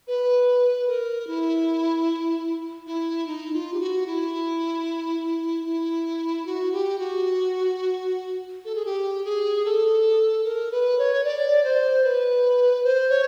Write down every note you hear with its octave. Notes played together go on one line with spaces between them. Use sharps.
B4
A#4
E4
E4
D#4
F4
G4
F#4
E4
E4
F#4
G4
F#4
A4
G#4
G4
G#4
A4
A#4
B4
C#5
D5
C5
B4
C5
C#5